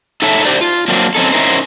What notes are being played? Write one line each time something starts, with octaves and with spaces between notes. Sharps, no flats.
D#4 A4 C#5 E5 A5
D4 G4 C5 D5
F4
F#3 A#3 C4 D4
C4 C#4 D#4 A4
C#4 D#4 E4 A#4 C5